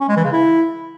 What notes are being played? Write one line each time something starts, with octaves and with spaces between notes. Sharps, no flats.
C#4
G#3
E3
C#3
E4